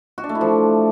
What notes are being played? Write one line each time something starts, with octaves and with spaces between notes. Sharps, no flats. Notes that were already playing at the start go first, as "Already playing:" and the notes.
F#4
D4
A3
E4
F3